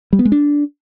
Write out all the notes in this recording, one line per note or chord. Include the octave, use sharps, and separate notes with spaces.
G3
B3
G#3
D4